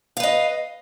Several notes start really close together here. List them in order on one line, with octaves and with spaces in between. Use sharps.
F5 B4 D#5